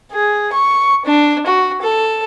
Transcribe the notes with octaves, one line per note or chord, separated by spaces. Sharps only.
G#4
C#6
D4
F#4
A4